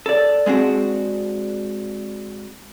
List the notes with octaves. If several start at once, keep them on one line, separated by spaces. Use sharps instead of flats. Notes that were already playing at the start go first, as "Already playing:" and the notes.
A4 D5
G#3 C4 D4 F#4